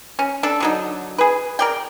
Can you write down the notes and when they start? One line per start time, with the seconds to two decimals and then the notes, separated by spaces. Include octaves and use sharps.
0.19 C#4
0.43 D4 A4
0.60 D3 F#3 D#4
1.18 G#4 B4
1.59 A#4 D5 G5